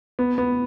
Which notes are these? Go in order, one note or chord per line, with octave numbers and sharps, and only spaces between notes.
B3
B3